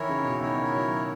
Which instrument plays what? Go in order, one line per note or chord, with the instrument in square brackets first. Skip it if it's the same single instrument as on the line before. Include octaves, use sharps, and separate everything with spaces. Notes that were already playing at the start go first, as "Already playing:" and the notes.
Already playing: [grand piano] D#3 E3 [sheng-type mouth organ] E4 A#4 C#5
[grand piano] C#3
B2
[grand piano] D#3 [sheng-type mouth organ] E4 A#4 C#5
[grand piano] F#3